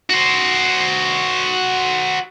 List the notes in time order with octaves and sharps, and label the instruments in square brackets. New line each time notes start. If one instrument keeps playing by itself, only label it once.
[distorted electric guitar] F#4 C5